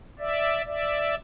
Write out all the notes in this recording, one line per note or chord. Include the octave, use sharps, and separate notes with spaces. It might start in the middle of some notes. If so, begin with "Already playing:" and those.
D5 E5
D5 E5